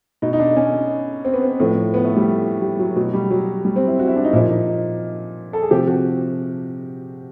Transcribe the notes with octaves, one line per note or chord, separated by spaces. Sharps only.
B2 D#4
D#4
D4
C#4
C4
B3
C4
A2 F3
B3
A3
G3
G3
F#3
B2 F#3
G3
F#3
G3
C4
E4
F#4
E4
D4
D#4
A#2 F3 E4
D#4
A4
G#4
C3 F3 G4
F#4